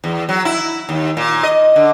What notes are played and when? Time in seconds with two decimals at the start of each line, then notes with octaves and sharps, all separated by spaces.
0.04 E2
0.29 F#3
0.45 E4
0.89 D#2
1.17 A#2
1.43 D#5
1.76 D3